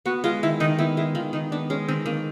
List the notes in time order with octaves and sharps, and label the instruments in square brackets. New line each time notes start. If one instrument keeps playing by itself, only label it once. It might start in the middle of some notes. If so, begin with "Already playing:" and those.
[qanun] B3 [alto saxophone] F#4
[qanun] G#3 [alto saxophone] F4
[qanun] D#3 [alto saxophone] E4
[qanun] D#3 [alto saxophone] D#4
[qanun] B3 [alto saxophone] E4
[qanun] G#3 [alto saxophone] E4
[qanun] D#3 [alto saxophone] F4
[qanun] D#3 [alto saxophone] D#4
[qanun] B3 [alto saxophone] D4
[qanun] G#3 [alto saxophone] C#4
[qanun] D#3 [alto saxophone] C4
[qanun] D#3 [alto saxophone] A#3